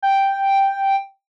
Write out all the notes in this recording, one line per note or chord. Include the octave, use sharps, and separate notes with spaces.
G5